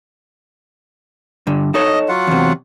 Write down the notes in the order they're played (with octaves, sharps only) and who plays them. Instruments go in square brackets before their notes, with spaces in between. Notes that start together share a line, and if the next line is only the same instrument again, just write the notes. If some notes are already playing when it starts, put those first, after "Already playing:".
[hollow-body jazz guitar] G2 D3
[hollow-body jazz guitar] D#4 A4 C#5 [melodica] D#5
[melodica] F#3 F4 F#5
[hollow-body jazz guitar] E2 C3